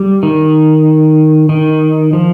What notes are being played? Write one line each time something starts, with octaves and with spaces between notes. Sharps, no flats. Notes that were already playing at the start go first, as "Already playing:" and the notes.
Already playing: G3
D#3
D#3
F3